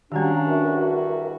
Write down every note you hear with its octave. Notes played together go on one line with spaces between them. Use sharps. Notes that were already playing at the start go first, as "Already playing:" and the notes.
D#3 G3 C#4 D4 F#4 G4 F5 A#5
E2 G2 F#4 A#4 E5